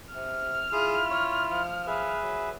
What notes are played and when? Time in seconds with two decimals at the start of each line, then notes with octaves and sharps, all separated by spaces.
0.14 C3 F6
0.72 E4 F4 G#4
1.11 C#5
1.50 F3
1.87 G#4 B4 E5
2.22 F#3